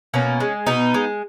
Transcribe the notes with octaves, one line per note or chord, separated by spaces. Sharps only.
B2 A#3 C#4
G#3
B2 B3 D#4
G#3